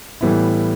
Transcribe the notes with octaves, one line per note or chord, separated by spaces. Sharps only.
A2 E3 G3 B3 E4